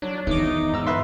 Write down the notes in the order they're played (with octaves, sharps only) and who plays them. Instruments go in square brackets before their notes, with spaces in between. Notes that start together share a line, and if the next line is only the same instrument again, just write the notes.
[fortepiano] F#3 [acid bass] D4
[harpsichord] E2 D6 [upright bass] D#3 [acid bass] D#4
[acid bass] G#2 [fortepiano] A#5 E6
[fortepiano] B4 E5 C6